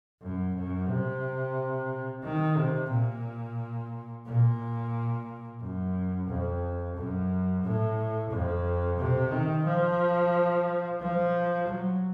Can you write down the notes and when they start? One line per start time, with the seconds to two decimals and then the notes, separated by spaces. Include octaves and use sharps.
0.21 F#2
0.55 F#2
0.89 C3
2.24 D#3
2.57 C3
2.91 A#2
4.26 A#2
5.61 F#2
6.28 F2
6.96 F#2
7.63 A2
8.31 F2
8.98 C3
9.31 D#3
9.66 F3
11.00 F3
11.68 F#3